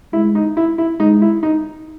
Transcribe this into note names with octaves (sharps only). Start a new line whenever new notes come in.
G#3 E4
D#4
E4
E4
G#3 D#4
E4
D#4